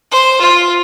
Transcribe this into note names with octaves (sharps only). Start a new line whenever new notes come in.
C5
F4